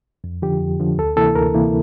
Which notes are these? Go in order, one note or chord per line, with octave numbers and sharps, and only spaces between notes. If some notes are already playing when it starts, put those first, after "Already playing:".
F2
D3 F3 G4
F2
D3 F3
D2 A4
C3 E3 A#3 E4 A4
D2 A#4
C3 E3 A#3 E4